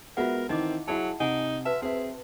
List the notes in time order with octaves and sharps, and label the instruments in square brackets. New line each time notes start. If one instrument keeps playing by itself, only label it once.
[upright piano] G#3 B3 F#4 [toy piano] F4 E5 F#5 [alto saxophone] A#4
[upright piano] D#3 E3 [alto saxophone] C4 [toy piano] D#4 D#5 D6
[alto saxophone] F#3 [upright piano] E4 G#4 [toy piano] F#5 A5
[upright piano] C3 [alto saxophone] D#4 [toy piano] F#5 G#5
[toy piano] F#4 B4 A5 [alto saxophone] E5
[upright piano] C4 E5 [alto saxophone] G#4